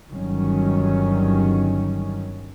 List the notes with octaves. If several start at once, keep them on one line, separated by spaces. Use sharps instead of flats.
G1 D#3 F#3 G3 C#4